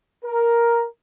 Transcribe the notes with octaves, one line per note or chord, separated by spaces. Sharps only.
A#4